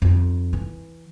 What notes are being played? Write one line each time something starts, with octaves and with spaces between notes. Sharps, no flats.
F2 D#4
E3